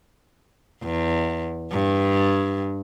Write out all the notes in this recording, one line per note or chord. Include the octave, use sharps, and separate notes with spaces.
E2
G2